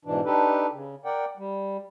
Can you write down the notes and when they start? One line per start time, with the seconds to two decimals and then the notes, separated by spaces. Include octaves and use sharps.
0.05 G#2 B2 E3 D4
0.25 D4 D#4 G4 A4 B4
0.72 C#3
1.05 A#4 D5 F#5 G5
1.37 G3